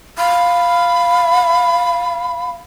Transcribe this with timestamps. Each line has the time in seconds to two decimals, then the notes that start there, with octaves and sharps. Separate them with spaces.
0.18 F5 B5